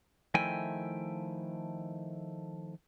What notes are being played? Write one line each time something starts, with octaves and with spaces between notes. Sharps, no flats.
D#3 F3 A3 E4 G5 G#5